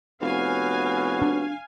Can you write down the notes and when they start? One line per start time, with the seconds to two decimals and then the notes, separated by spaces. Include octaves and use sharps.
0.22 F1 B3 C#4 F#4 F5 G#5
1.22 D4